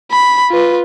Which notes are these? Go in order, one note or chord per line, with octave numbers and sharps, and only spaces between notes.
B5
F4 B4